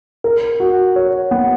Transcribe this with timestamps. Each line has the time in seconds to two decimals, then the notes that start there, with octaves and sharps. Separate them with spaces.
0.24 A#4
0.60 F#4
0.96 C#5
1.31 B3